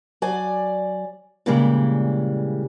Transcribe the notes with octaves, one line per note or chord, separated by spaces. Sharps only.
F#3 D5 G#5
A#2 C#3 E3 G3 G#3